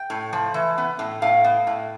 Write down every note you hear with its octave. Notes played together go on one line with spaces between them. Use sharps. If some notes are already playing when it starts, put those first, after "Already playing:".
Already playing: G5
A2
F3
E3
B3
A2
A2 F5
B3
A2